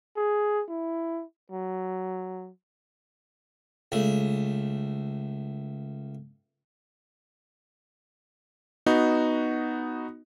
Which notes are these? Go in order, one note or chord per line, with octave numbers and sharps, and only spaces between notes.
G#4
E4
F#3
C#2 A3
B3 D#4 F#4